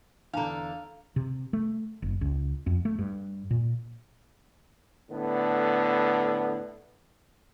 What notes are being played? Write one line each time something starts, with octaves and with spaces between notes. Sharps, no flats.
E2 D3 D4 F5 A5 A#5
C3
A3
F#1
C#2
F2
A3
G2
A#2
A2 D3 B3